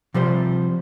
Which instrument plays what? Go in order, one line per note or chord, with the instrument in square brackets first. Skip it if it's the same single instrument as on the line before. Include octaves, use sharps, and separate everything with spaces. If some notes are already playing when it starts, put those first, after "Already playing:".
[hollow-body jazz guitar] C3 F3 G3 C5